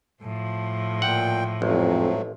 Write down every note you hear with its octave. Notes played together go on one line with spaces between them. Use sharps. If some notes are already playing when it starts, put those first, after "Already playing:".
A2 F3
A#2 F#5 G5
A1 F2 G#2 F#3 A3